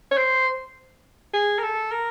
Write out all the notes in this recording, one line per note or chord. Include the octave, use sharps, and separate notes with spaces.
C#5
C5
G#4
A#4
A4
A#4